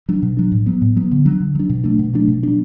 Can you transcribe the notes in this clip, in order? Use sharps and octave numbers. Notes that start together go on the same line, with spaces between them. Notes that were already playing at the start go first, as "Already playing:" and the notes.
F#3 D4
B2
F#3 D4
A2
F#3 B3
A2
F#3 B3
D3
F#3 D4
D3
F#3 D4
B2
F#3 A3 D4
B2
F#3 A3 D4
B2
F#3 B3 D4